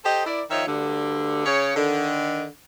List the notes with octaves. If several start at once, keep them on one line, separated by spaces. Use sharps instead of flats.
G4 A4 C5 D#5
E4 A#4 D5
D#3 F3 C#5 D#5 E5
D2 G2 D3
C#3 C#5
D3 D#3